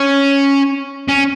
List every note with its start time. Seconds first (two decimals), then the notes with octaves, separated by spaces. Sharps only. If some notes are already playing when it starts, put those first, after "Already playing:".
Already playing: C#4
1.09 C#4